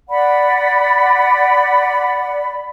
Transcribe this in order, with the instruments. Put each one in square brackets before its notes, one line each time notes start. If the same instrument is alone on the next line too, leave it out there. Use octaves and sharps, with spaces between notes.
[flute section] D5 F#5 B5